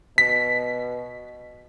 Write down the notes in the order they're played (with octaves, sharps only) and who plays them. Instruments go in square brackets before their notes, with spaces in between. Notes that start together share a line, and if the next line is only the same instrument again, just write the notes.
[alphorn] B2 [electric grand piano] B6